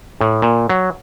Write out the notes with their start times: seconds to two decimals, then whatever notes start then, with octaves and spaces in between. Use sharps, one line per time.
0.21 A2
0.42 A#2
0.69 F#3